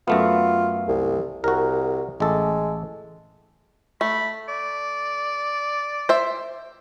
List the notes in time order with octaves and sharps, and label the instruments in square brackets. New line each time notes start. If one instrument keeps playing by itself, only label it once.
[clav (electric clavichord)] F#2 A3 B3 [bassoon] F4
[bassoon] C2
[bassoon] C2 [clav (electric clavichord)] F#4 A#4
[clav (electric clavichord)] A1 A4 [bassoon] G#3
[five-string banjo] A3 [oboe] B5
[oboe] D5
[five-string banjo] C5 E5